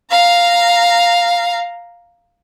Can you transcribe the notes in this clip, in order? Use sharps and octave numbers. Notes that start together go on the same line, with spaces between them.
F5 A#5